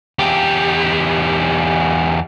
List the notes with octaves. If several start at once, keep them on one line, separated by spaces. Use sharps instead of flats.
E2 G4